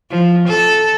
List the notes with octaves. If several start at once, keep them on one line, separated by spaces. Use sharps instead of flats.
F3
A4